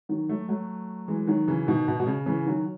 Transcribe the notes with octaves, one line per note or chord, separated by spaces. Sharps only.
D#3 F#3
F#3 A3
F#3 A3
E3 G#3
D#3 F#3
C#3 E3
B2 D#3
B2
B2
C#3
C#3 E3
D#3 F#3